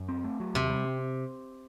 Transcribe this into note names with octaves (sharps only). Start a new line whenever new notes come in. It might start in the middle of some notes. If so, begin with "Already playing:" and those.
Already playing: F#2
C4
A3
F#3
D#2 C3
G3
C4